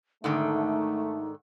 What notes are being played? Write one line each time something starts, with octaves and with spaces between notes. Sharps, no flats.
G#2 D3 D#3 A3 D#4